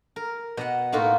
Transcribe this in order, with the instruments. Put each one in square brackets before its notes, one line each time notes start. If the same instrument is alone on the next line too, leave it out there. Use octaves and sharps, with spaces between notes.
[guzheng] A#4
B2 D#5 F#5
A2 A#3 D#4 F4 F#4